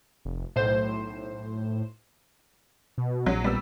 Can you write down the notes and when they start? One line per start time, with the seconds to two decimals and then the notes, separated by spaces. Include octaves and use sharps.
0.25 F1
0.56 B1 A2 C5 E7
2.98 B2
3.26 A#1 F#3 F#4
3.44 G3 B3 E6